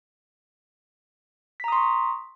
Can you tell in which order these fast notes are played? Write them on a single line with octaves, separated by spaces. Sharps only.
B6 A#5 D#6 C6 C#6